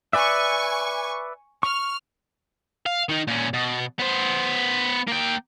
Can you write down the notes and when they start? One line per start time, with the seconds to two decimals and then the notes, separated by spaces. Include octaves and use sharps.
0.13 B4 D5 E5 G#5 C#6
1.63 C#6 F6
2.86 F5
3.09 D#3 D#4
3.27 A#2 C#4
3.53 B2
3.99 B3 C5
5.08 A#3 G5